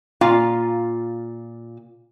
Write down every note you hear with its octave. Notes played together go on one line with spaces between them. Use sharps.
A#2 F4 F5